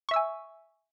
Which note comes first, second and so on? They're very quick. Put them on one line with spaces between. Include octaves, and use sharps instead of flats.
C#6 E5 E6 G#5